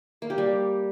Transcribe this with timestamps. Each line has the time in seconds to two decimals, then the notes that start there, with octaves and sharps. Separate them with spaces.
0.22 A#3
0.30 G4
0.38 G3